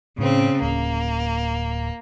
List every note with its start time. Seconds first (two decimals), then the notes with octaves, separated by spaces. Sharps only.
0.19 A2 C#3 C4
0.62 D1 A#3